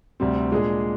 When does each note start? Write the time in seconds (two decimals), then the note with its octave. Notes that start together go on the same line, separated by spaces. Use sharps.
0.20 D2 C3 G3 C4
0.51 A#2 G#3 D4 G#4